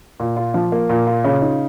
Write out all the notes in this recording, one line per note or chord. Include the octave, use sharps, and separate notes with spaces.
A#2
F4
F3
A#3
A#2
F4
C#3
D#4